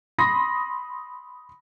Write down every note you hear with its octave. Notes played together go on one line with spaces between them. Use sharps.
B5 C6 D#6 A#6